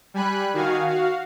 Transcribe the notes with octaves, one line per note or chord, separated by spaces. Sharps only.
G3 G#5 B5 F#6
D#3 F#4 F5 G#5
F#4 F5